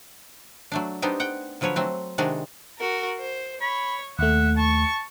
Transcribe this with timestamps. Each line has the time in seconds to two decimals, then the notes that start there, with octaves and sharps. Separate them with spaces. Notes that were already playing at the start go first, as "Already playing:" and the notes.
0.72 F#3 A3 D4
1.02 B3 C4 D4 D#4 G4
1.20 F#5 G5
1.61 D3 F3 F#3 B4 C#5
1.76 F#3 A3 C4 F#4
2.18 C3 D#3 G#3 D4 F#4
2.79 F#4 A#4
3.19 C5
3.61 C#5 B5
4.19 D#2 A3 E5 F#5
4.57 A5 C#6